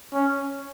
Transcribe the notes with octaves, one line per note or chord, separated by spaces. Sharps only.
C#4